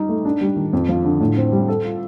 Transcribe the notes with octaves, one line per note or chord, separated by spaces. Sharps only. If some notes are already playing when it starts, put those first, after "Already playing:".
Already playing: G3 D#4
A3
D4
G3
D#3
F2
F3
D3
A2
C4
G3
A4
F4